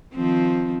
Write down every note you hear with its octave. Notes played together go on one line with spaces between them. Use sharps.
D#3 F3 C4